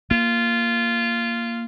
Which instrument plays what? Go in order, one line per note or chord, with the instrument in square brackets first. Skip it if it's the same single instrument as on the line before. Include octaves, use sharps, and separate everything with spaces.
[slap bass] A#3 [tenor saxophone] F4